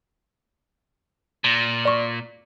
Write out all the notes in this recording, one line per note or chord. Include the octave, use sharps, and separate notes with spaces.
A#2
D5 C#6